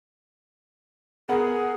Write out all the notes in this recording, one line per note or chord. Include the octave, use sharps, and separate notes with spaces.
B3 G#4 A#4 F#5